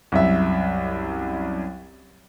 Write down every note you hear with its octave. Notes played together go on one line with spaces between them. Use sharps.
C2 F#2 E5